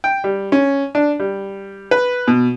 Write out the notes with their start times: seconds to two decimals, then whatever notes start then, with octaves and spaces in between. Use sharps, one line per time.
0.04 G5
0.24 G3
0.52 C#4
0.95 D4
1.20 G3
1.91 B4
2.28 B2